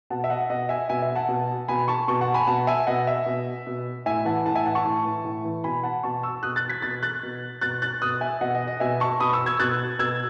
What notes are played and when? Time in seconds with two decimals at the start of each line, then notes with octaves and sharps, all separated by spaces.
0.10 B2 F#5 A5
0.24 E5
0.30 D#5 F#5
0.50 B2 D#5 F#5
0.69 E5 G#5
0.89 B2 E5 G#5
1.02 E5
1.15 F#5 A5
1.29 B2
1.68 B2 G#5 B5
1.88 A5 C#6
2.08 B2 A5 C#6
2.21 F#5 A5
2.34 G#5 B5
2.47 B2 F#5 A5
2.67 E5 G#5
2.87 B2 D#5 F#5
3.07 E5
3.26 B2
3.67 B2
4.06 A2 E5 G#5
4.25 E3 F#5 A5
4.45 A2 F#5 A5
4.55 E5 G#5
4.65 E3 F#5 A5
4.75 A5 C#6
4.85 A2
5.05 E3
5.25 A2
5.44 E3
5.64 B2 G#5 B5
5.83 F#5 A5
6.03 B2 A5 C#6
6.23 C#6 E6
6.43 B2 D#6 F#6
6.56 F#6 A6
6.69 G#6 B6
6.82 B2 F#6 A6
7.03 F#6 A6
7.23 B2
7.61 B2 F#6 A6
7.82 F#6 A6
8.01 B2 D#6 F#6
8.21 E5 G#5
8.41 B2 D#5 F#5
8.55 D#5
8.67 D#5
8.80 B2 E5 G#5
9.00 A5 C#6
9.20 B2 B5 D#6
9.33 C#6 E6
9.46 E6 G#6
9.60 B2 F#6 A6
9.99 B2 E6 G#6